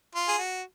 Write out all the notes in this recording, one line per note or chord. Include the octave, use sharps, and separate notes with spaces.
F4
G#4
F#4